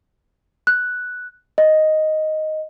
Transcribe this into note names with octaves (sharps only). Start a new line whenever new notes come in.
F#6
D#5